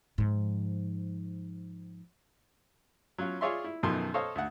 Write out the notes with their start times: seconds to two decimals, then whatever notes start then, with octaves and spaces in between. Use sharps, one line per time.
0.18 G#2 F3
3.18 F#3 C#4 F4
3.41 F4 G#4 C#5 D5 E5 C6
3.64 E4
3.83 F#2 B2 D#3 F3 A4 C6
4.14 A4 C5 C#5 D#5 F5
4.35 D2 F#5